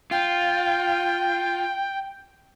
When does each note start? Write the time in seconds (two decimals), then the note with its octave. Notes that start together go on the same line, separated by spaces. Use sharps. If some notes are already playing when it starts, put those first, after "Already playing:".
0.11 F4 G5